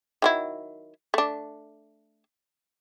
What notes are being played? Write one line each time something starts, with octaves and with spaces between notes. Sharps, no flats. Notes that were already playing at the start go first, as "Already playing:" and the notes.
D#3 F#3 E4
A3 D4